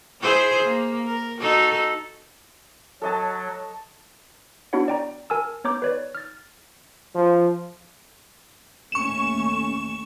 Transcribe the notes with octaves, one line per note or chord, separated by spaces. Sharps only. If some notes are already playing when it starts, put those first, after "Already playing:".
E4 G#4 C5
A#3
A#4
D#4 F#4 A4
F#3 A4 D#5 A5
B3 D4 E4 F#4 C#5 F#5
D5 G5 A#5
A#4 G#5 A5 E6
B3 C#5 A#5 D6 G6
B4 C#5 D5
F6 A6
F3
D#2 A3 C#4 C#6 E7